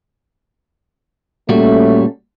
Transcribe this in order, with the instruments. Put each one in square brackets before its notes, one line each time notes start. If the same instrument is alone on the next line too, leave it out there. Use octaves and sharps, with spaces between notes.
[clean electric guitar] A#2 G3 F#4 [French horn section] A3 C#4